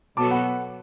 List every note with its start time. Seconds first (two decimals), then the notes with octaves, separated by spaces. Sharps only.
0.17 B2 F#3 B3 F#4 A4 A5 D6
0.31 F#5 B5